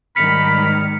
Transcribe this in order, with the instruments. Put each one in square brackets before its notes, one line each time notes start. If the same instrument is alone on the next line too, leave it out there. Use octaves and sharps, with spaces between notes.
[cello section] G#2 D#3 G3 [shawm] B5 [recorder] F6 [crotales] B6 C#7